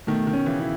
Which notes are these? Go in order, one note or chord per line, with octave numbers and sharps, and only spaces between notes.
B2 D#3 A3
B2 D#3
C#4
C#3 E3
E4